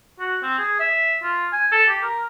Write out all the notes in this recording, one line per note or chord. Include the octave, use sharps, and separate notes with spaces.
F#4
C4
G#4
E5
F4
G#5
A4
G4
A#4